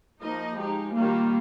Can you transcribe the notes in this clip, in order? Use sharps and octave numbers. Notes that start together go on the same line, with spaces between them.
F3 A#3 D#4 D#5
G#3 D#4 G4
D#3 G3 A#3 F4